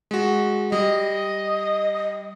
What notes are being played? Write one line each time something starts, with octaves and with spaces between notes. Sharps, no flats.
G#3 F#4
G3 D#5